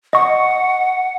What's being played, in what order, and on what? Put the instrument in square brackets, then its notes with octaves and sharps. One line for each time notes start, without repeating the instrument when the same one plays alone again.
[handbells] D#5 C#6 [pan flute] F#5